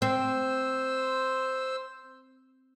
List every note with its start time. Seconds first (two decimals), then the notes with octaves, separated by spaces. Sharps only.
0.02 C4 C5 E6